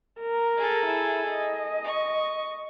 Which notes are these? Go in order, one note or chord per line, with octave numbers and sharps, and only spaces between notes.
A#4
G#4 A4
E4
D#5
C#6